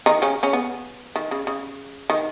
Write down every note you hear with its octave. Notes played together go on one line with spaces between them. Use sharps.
D#3 D#4
C#3 C#4
C#3 C#4
B3
D#3
C#3
C#3
D#3